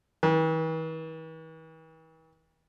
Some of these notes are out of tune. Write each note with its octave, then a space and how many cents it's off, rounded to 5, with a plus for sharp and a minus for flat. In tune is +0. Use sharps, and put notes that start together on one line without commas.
E3 -45